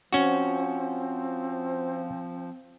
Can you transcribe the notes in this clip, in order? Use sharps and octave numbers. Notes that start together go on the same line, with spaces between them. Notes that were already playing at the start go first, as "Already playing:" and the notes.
F3 C4 C#4 F#4